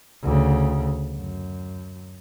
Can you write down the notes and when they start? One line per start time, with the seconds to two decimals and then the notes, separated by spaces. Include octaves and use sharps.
0.23 D2 C#3
1.15 F#2